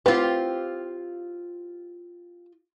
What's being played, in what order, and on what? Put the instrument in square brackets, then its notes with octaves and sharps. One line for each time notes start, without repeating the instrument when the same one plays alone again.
[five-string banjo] C4 B4 [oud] F4 G4